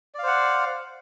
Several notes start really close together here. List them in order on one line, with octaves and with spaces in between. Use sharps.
D5 F5 C5 F#5